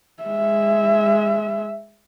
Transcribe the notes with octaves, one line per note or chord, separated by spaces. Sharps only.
G#3 E5